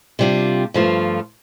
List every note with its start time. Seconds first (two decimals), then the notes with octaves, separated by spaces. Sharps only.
0.19 C3 G3 D4 F4
0.74 G2 F3 A3 F4